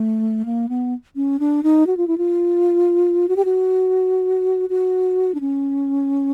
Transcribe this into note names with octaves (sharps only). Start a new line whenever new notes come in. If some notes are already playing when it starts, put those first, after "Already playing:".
Already playing: A3
A#3
B3
C#4
D4
D#4
F#4
F4
E4
F4
F#4
G4
F#4
F#4
D4
C#4